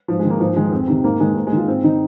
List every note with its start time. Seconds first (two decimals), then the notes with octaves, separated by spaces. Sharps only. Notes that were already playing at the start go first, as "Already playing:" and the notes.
0.08 G#2 F3
0.19 G#3
0.25 D#3
0.30 A#3
0.40 G#2 F3
0.56 D#3 G#3
0.72 F2 C4
0.88 C3 D#3
1.04 G#2 A#3
1.20 D#3 G#3
1.36 G#2 A#3
1.47 G#3
1.52 D#3 F4
1.68 G#2 C4
1.84 D#3 D#4